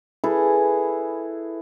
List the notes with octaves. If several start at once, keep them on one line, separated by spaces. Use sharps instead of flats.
E4 G#4 A4 B4